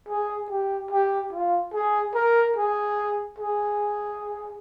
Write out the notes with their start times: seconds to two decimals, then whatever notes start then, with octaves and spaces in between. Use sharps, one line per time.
0.09 G#4
0.50 G4
0.91 G4
1.33 F4
1.73 G#4
2.15 A#4
2.56 G#4
3.39 G#4